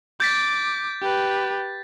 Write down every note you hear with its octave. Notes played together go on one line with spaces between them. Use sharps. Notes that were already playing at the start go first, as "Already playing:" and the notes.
D6 G6 A6 B6
G4 B4